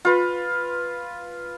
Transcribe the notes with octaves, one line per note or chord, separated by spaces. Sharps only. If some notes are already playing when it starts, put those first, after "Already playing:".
F4 B4